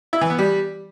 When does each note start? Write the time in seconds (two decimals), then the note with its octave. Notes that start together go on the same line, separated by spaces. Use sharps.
0.13 E4
0.21 E3
0.30 B3
0.38 G3